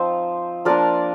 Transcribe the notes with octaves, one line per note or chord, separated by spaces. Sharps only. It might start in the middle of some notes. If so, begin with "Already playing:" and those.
Already playing: F3 C4 D#4
F3 A#3 D4 A#4 D5